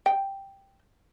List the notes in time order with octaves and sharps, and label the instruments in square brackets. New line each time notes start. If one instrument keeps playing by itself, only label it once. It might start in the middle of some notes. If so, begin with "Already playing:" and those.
[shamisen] G5